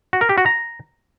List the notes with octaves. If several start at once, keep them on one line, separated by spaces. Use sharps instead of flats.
F#4
A#4
G4
F#4
A#5